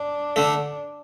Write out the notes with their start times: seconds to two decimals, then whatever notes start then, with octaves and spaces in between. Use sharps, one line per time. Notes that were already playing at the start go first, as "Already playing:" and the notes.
Already playing: D4
0.36 D3 A3